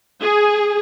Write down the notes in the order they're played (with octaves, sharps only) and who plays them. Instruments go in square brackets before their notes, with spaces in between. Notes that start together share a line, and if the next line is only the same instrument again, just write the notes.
[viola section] G#4